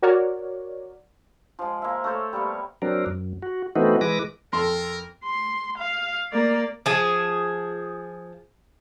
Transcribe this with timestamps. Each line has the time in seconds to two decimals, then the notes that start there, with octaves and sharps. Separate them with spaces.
0.02 F#4 A#4 C#5 D5
1.59 F3 G#3
1.82 A#3 E5
2.04 A3 A4 C5 C#5
2.33 G3 A#3 B3 C#6
2.82 F#3 C4 D4 A#4
3.06 F#2
3.42 F#4
3.76 E3 A3 B3 C4 D#4 F#4
4.01 E3 G#3 B4 D6 A#6
4.53 F2 A4 A#4 C6
5.24 C6
5.78 F5
6.32 A#3 D5
6.86 F3 G#4